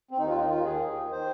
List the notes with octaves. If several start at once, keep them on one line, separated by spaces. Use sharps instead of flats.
C4
D#2 D#3 D#4
F4
D#4
D#2 D#3 F4
G#4
D#2 D#3
D#3 C5